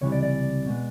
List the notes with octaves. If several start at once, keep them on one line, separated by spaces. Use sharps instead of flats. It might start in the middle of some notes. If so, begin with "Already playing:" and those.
C#2 C3 E3 G3 C#5
D5
D5
B2 G#3 B3